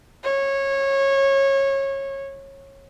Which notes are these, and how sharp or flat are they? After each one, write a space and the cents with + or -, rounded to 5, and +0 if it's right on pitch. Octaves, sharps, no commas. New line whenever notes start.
C#5 -20